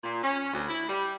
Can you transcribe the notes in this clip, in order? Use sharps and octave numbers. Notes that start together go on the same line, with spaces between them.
A#2
C#4
D2
E4
G3